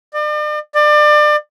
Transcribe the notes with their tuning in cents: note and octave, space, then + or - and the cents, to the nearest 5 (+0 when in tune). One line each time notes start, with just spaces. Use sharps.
D5 +40
D5 +30